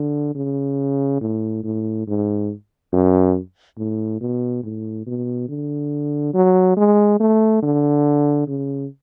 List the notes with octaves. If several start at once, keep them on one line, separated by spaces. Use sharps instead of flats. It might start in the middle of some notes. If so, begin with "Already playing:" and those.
Already playing: D3
C#3
A2
A2
G#2
F#2
A2
B2
A2
B2
D3
F#3
G#3
A3
D3
C#3